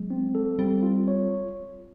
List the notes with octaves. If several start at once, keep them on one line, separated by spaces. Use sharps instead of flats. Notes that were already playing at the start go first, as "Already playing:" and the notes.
Already playing: F#3 G#3
C4
A4
G3 C4
F4
C#5